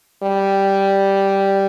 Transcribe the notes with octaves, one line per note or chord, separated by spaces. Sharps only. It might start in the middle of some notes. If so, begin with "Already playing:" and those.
G3